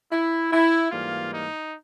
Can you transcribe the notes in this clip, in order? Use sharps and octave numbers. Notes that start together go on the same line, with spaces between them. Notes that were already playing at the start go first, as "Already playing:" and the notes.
E4
E4
G#2 E3 G3 A#3 F4
D#4